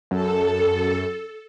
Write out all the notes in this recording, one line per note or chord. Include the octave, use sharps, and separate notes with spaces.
F#2 A4